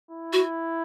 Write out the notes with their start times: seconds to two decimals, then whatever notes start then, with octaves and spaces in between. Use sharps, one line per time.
0.11 E4
0.33 F#4